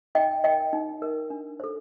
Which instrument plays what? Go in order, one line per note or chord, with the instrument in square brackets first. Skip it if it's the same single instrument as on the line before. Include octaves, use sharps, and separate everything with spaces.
[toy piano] D#4 D#5 G5
A#4 D#5 G5
D#4
A#4
D4
A4 C5